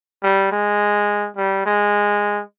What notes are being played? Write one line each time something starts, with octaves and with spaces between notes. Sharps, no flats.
G3
G#3
G3
G#3